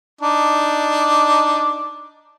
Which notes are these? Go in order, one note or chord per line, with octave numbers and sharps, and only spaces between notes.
D4 D#4 D6